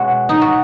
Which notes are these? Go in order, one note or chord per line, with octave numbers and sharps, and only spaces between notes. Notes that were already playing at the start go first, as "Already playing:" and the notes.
Already playing: B2 G#3 C#4 F#4
D#4
F#4